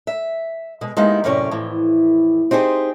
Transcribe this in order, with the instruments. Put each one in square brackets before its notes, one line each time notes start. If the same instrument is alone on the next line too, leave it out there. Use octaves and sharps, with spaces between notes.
[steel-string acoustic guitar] E5
B2 G#3
G#3 A#3 B3 D#4 E4 G4
F#2 A2 C3 C#4 C#5 D5
F2 A2 E3
C4 D#4 G4 G#4 C5